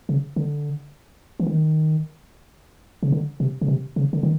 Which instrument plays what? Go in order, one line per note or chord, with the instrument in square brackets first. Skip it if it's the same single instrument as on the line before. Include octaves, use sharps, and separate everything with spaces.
[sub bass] C#3
D3
E3
D#3
C#3
D3
C3
C#3
C3
C#3
D3
D#3